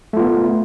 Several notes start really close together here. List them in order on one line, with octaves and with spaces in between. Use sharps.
A3 F4 B3